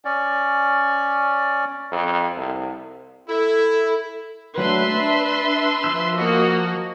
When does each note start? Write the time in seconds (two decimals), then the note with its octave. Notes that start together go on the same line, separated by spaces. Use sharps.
0.05 C#4 D5
1.92 F2
2.37 C2
3.28 E4 A4
4.58 F#3 A3 D4 B4 E5 C6
4.87 D4
5.84 F3 E6
6.16 A#3 F#4 D#5